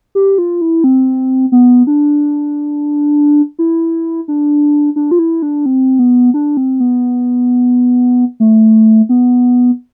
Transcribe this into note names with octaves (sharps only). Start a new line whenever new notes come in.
G4
F4
E4
C4
B3
D4
E4
D4
D4
F4
E4
D4
C4
B3
D4
C4
B3
A3
B3